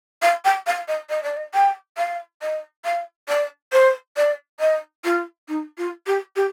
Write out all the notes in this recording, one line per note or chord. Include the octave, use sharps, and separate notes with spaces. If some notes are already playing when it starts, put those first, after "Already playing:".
F5
G5
F5
D#5
D#5
D5
D#5
G5
F5
D#5
F5
D5
C5
D5
D#5
F4
D#4
F4
G4
G4